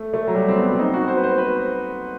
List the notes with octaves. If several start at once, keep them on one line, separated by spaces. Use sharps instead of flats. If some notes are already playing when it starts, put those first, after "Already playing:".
Already playing: A3
A3
F#3
G3
C4
B3
C4
D#4
F#4
C5
B4
C5
B4